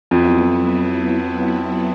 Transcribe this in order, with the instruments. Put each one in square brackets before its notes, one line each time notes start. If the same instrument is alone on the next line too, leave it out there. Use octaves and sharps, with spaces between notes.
[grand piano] F2 [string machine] F#3 B3 E4